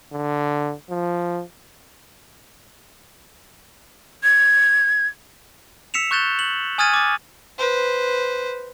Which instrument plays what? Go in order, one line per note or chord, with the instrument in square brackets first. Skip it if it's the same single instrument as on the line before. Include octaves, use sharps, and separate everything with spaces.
[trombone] D3
F3
[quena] G#6
[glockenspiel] E6 B6 C#7 E7 F7
C#6 F#6 G6 A6 E7 G7
F#7
G#5 D#6 F6 G#6 A6 D#7
D6 A6
[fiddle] B4 C5